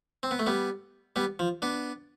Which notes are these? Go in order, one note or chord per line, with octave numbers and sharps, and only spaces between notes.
C4
B3
A3
G3 B3
G3 B3
F3
B3 D4